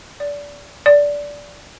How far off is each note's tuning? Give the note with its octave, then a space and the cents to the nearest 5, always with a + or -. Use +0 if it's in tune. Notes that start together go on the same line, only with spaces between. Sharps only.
D5 -25
D5 -15